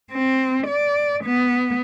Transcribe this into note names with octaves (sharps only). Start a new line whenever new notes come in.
C4
D5
B3